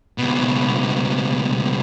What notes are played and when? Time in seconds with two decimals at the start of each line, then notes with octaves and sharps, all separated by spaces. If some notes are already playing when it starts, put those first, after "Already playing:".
0.18 C#2 B2